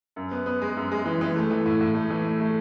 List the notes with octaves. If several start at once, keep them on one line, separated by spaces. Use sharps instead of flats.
F#2
B3
B3
G#3
F#2
G#3
E3
E3
A3
E3
A2
A2
A3
E3
A3
A3